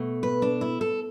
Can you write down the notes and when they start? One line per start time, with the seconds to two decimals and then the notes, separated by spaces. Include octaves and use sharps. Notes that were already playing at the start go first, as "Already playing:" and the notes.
Already playing: B2 A3
0.23 B4
0.42 D4
0.61 E4
0.81 A4